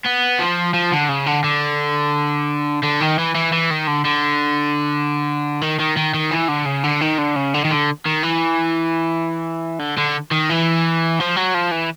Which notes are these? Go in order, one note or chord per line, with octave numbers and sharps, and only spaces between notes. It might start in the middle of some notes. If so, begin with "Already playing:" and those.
B3
F3
F3
D3
C#3
D3
D3
D3
D#3
E3
E3
E3
D#3
D3
D3
D#3
D#3
D#3
D#3
E3
D3
C#3
D3
D#3
D3
C#3
D3
D#3
D3
D#3
E3
D3
D3
D#3
E3
F3
F#3
F3
E3